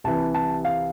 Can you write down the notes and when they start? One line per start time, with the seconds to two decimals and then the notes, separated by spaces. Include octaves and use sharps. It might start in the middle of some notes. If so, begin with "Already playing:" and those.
0.04 C2 C3 E3 A5
0.34 A5
0.65 F5